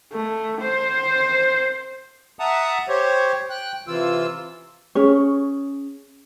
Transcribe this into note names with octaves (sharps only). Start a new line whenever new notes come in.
A3
C5
E5 F#5 A5 A#5 D#6
G4 C5 C#5
G5 F#6
C3 E3 F4 E6
C#4 G#4 C#5